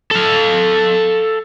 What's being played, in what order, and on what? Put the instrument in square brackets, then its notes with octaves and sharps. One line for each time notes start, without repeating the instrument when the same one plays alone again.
[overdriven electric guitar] A4 F5